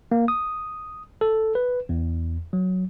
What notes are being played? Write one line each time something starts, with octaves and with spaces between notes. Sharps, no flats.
A#3
D#6
A4
B4
E2
F#3